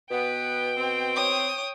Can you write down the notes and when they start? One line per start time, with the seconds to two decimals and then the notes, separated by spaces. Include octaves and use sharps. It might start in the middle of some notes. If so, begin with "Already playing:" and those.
0.11 B2 B3 G5
0.77 C4
1.16 C#5 D#6